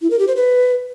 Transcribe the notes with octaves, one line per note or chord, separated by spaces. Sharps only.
E4
A#4
G4
C5
B4